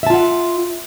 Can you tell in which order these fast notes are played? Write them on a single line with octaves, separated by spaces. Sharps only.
E5 A5 F4 F#5